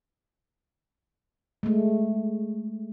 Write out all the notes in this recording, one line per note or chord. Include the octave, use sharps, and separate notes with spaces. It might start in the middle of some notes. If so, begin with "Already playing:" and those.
G#3 A3